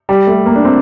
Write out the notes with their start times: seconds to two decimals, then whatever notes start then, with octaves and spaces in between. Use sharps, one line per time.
0.09 G3
0.27 A3
0.46 A#3
0.56 D4
0.65 C4